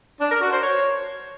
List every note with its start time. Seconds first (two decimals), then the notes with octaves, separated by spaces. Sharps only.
0.19 D4
0.30 A#4
0.40 F#4
0.51 C5
0.62 C#5